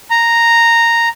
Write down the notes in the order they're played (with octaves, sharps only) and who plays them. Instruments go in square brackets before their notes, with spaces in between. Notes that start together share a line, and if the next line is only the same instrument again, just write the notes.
[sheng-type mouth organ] A#5